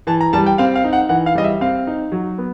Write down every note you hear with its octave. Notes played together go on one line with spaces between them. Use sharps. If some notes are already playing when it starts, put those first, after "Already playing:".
E3 A5
A#5
G3 A5
G5
C4 F5
F5
D#4
F#5
E3 F#5
F5
G3 D#5
E5
C4 F5
D#4
F#3
B3